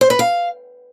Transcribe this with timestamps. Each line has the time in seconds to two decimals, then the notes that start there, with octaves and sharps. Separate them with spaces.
0.01 C5
0.10 B4
0.19 F5